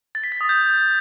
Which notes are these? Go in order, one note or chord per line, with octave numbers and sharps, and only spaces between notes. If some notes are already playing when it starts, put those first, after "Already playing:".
A6
B6
A6
D#6
G6